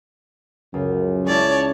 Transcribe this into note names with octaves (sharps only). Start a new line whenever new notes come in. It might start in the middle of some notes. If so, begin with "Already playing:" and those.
C#2 F#2
G#3 C#4 E4 C#5 D5 A5